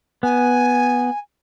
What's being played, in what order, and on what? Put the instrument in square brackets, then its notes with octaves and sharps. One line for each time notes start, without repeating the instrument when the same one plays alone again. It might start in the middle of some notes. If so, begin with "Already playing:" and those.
[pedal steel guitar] B3 [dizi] G#5